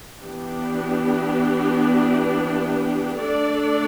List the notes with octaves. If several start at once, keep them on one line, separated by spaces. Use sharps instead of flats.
E3 B3 D4 G4
A3 D4 A4 D5